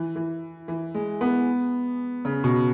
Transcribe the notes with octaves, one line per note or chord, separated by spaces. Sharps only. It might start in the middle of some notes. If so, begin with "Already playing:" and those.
Already playing: E3
E3
E3
G#3
B3
C#3
B2